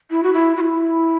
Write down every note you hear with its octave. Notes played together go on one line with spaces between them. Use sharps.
E4
F#4
E4
F#4
E4